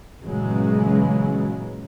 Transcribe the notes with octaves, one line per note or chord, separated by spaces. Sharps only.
G1 A#2 C#3 E3 F#3 G#3